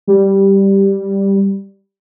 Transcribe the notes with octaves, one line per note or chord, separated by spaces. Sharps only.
G3